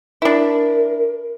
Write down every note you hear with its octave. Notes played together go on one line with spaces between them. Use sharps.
D4 E4 A#4